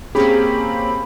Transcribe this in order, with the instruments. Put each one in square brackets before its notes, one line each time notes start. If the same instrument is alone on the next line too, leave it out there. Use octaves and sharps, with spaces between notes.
[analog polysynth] A#3 C#4 [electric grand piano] C4 G4 [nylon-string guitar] G#4 [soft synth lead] B5